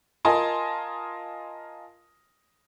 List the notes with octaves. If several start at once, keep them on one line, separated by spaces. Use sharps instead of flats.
F4 A#4 D#5 G#5 A5 C6